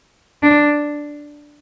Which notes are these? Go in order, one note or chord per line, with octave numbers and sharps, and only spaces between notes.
D4